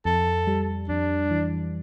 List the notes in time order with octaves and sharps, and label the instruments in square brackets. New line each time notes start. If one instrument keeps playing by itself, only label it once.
[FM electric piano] F2 [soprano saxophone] A4
[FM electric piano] G3
[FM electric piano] F2 [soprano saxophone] D4
[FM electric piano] E3